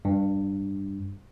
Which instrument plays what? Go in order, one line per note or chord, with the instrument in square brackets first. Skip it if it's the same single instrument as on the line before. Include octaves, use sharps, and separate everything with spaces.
[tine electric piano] G2